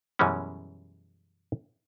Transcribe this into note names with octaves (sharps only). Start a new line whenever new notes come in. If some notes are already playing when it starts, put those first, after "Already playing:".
F#2 B2 E3 G3 G#3 C#4